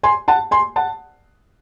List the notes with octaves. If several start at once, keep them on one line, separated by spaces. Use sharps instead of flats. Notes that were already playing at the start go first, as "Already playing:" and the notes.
G#5 C6
F#5 A5
G#5 C6
F#5 A5